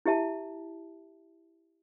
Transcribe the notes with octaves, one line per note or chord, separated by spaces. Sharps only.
E4 G4 E5 A5